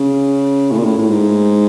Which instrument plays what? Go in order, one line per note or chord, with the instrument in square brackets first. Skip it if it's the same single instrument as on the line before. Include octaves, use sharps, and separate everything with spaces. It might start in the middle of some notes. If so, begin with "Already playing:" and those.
Already playing: [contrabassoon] C#3
A2
A#2
A2
A2
G#2